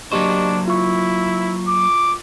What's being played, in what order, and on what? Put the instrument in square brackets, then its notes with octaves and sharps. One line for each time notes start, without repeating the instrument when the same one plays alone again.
[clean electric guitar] F#3 A#3 C5 [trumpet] D4 [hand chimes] G4 D#5 C#6
[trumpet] E4 [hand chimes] F4 C#6
[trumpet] D6